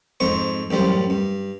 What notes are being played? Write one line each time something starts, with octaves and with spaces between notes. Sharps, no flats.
F2 G#2 C5 C#6
A1 F#2 G3 C5
G2